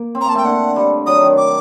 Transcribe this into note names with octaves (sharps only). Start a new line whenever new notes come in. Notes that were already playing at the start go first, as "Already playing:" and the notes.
Already playing: A#3
C4
A#5
A#3 A5
A3 G5
D3 F#5
G3
F#3 D#6
D#3
D6